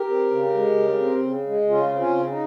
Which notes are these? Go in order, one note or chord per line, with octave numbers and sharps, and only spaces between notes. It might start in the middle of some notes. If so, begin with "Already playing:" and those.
Already playing: G4 A#4
C4
C#3
G#3
C#3
C4
C#3
G#3
C#3 C#4 F4
C4
C#4 F4
C#3
D#4